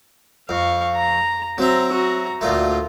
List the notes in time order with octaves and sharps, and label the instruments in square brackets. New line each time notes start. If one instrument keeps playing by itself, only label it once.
[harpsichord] F2 [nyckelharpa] F5 C#6
[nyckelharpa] A#5
[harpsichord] F#3 E5 [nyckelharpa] C4 A#5
[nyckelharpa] F#4 A#5
[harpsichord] D2 A#2 A3 [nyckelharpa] F4